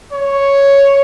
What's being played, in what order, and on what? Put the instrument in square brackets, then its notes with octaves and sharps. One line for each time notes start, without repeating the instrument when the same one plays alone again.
[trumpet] C#5